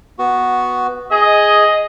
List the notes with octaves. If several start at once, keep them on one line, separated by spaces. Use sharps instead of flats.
B3 F#4
G#4 D#5